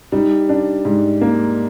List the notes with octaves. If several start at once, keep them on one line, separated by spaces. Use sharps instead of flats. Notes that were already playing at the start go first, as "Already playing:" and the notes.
G3 D#4
D4
G#2
A#3